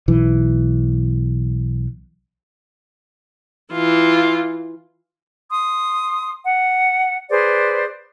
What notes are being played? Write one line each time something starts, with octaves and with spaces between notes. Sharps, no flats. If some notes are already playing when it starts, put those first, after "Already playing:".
B1 E3
E3 F4
C6 D#6
F#5
G#4 B4 C5 D5